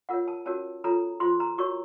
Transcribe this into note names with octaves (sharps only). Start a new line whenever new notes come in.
F4 A#4 C#5 F#5
A5
C#4 F#4 A#4 C#5 A5
F4 A4 C#5 A#5
F4 C5 C6
A#5
F#4 A#4 C#5 C#6